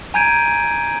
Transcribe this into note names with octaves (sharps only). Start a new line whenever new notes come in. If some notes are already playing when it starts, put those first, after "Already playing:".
G#5 A#5 G6 G#6 D7 D#7